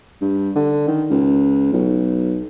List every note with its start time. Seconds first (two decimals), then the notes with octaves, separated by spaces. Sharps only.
0.22 G2
0.55 D3
0.88 D#3
1.10 C#2
1.73 B1